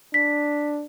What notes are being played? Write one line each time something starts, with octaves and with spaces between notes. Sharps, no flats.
D4 B6